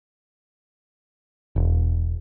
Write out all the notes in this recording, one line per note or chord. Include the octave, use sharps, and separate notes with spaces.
E1